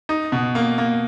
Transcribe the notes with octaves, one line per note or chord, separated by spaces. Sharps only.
D#4
B2
A#3
A#3